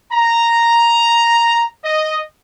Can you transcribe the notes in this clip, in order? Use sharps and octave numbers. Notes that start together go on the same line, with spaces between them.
A#5
D#5